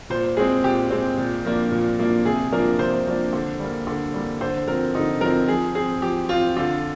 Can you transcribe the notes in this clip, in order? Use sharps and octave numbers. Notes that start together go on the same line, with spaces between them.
A#2 C5
G#3 C4 G#4
A#2 G4
G#3 C4
A#2
F3 A#3 D4
A#2
F3 A#3 D4
C3 G#4
F3 A#3 D4 A#4
C3 C5
F3 A#3 D4
D3
G3 A#3
D3
G3 A#3
D3 C5
F3 C4 A#4
D3 D#4
F3 C4 A#4
F3 G#4
C4 G#4
F3 G4
C4 F4
D3 F4